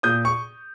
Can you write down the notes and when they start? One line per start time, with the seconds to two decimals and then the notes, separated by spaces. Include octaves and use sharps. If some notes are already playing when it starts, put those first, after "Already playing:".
0.03 A#2 D#6 G6
0.25 C#6